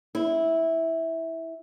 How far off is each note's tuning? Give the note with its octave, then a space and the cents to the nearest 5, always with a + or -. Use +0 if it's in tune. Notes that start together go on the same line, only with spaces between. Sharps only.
E4 -10